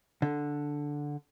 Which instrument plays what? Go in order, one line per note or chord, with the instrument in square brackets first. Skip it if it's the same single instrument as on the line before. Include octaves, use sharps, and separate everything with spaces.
[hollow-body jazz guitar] D3